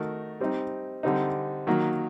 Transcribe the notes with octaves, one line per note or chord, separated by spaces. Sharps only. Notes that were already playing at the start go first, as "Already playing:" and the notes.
Already playing: D#3 A3 D#4 F#4 A#4
G3 C4 D#4
D3 G3 C4 D#4
D#3 F#3 A#3